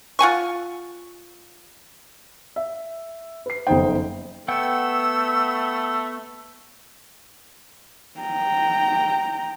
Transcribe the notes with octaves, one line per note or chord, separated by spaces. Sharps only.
F4 F#5 G#5 C#6
E5
B4 C7
F#1 F2 B3 D#4 C5 G5
A3 B3 F#5 G5 E6
G5 A#5